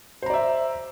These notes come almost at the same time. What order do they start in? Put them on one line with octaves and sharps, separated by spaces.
C5 A#5 D5 E5